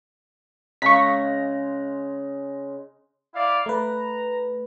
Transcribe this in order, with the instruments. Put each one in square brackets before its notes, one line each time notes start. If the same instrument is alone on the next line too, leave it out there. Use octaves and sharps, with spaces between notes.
[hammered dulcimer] C#3 G#3 A#5 [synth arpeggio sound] C#6 B6
[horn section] E4 D5 F5
[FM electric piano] A3 B4 [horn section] A#5